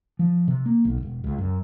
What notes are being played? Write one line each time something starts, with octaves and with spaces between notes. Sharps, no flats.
F3
C3
A#3
B1
E1
C#2
F#2